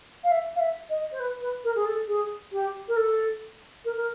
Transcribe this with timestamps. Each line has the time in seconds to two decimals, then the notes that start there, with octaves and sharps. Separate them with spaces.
0.23 F5
0.31 E5
0.55 F5
0.59 E5
0.89 D#5
1.11 C5
1.19 B4
1.41 B4
1.64 A#4
1.75 G#4
1.85 A4
2.07 G#4
2.52 G4
2.88 A#4
2.96 A4
3.84 A#4
3.96 A#4